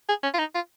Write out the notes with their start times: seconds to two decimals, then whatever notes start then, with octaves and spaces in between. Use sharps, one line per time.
0.09 G#4
0.23 C#4
0.34 F4
0.39 D#4
0.55 F4